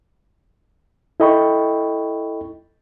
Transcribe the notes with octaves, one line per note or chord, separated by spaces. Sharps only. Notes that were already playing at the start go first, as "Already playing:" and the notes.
E4 A4 D#5 G5 B5 C#6